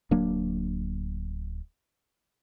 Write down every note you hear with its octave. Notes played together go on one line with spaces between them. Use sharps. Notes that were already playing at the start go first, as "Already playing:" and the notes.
D1 F#3 A#3 D4